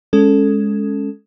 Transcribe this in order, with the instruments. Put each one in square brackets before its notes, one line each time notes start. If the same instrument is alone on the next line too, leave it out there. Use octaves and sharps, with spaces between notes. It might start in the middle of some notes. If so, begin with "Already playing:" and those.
[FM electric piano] G#3 C#4 A4